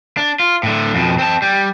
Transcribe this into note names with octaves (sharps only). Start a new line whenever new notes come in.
D4
F4
A2 D3
F2 B2
C4 A5
G3